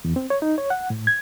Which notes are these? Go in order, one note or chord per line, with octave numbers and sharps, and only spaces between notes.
E2
C4
C#5
D#4
C#5
F#5
A2
G#6